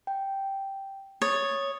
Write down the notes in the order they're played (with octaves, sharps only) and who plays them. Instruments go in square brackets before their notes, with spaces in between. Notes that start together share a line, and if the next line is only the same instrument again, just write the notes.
[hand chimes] G5
[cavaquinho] C#5 [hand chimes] D#6 A6